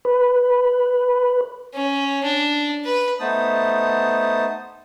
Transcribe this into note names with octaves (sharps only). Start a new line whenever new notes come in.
B4
C#4
D4
B4
A3 B3 D#4 C5 A5 D#6